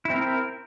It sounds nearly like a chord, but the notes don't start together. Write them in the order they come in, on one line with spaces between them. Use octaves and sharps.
E4 C4 A#4